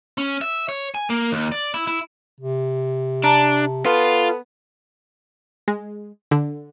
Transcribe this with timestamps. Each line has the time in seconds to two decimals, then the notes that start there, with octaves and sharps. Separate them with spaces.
0.18 C#4
0.41 E5
0.69 C#5
0.95 G#5
1.10 A#3
1.31 D#2
1.52 D5
1.74 E4
1.88 E4
2.41 C3
3.24 D4 A5 A#5
3.85 B3 F4 A4
5.68 G#3
6.31 D3